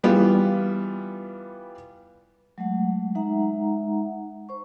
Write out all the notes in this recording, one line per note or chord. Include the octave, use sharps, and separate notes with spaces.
E3 G3 B3 F4
F#3 G#3 A3 F#5
G#3 D#4 E5 F#5 A#5
C5 C#6